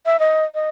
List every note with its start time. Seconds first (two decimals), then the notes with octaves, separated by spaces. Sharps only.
0.06 E5
0.19 D#5
0.55 D#5